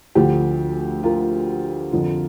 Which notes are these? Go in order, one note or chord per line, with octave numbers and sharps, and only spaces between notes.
D2 D3 F3 G4
F4 A#4
F2 D3 F3